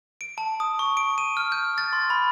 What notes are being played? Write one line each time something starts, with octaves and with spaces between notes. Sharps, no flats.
D7
A5
D#6
C#6
D7
D#7
F6
G6
A6
C6
B5